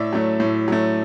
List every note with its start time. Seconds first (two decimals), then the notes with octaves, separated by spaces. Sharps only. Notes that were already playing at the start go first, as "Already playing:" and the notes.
Already playing: A2 D5 E5
0.13 F#3 A3
0.40 A2
0.68 F#3 A3